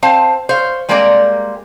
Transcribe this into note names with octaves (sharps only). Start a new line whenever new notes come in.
C4 C5 F5 A5
C5 C#5 F5
G3 G#3 A#3 C4 A#4 D5